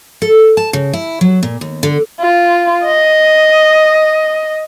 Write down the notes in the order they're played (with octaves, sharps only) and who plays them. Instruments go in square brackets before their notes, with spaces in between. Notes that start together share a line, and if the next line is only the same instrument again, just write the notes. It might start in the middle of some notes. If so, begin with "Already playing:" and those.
[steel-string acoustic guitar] A4
A5
C#3
E4
F#3
A#2
D#2
D3
[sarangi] F4
D#5